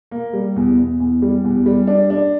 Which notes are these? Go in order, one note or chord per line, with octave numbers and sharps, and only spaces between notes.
A#3
G3
E2
E2
E2
G3
E2
G3
D4
D4